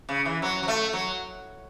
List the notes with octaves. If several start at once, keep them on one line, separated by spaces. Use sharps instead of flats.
C#3
E3
F#3
F#3
A3
F#3